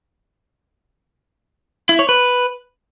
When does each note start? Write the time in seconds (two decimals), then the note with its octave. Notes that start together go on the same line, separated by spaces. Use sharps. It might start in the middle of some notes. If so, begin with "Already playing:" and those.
1.89 E4
1.99 C#5
2.09 B4